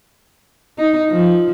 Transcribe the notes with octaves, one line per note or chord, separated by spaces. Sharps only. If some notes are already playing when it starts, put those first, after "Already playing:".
D#4
F3